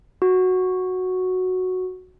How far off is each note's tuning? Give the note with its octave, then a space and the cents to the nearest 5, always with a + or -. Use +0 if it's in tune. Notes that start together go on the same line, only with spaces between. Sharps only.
F#4 -5